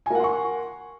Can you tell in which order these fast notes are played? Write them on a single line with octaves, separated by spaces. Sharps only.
G#5 A#4 F#5 C6 C#6